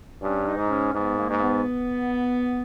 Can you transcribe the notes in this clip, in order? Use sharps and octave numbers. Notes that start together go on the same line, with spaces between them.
G2 C#4
D#4
G#2
C#4
G#2 B3
A#3
G#2
B3